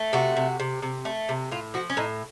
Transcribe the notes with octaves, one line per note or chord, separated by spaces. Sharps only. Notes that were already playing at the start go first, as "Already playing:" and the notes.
Already playing: A3
C3 F#4
C3
C3
C3
A3
C3
A2 F4
F3 F#4
C#4
A2 D#4